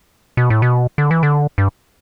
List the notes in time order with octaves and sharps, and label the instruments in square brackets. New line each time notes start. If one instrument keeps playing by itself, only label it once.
[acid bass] B2
A2
B2
D3
E3
D3
G2